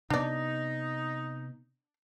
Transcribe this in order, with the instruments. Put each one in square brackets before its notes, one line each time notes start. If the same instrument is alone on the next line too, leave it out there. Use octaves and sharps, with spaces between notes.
[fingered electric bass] C3 B3 [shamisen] D4 D5 [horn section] D#4